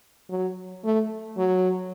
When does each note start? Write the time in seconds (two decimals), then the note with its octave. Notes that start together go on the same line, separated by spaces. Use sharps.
0.30 F#3
0.84 A3
1.37 F#3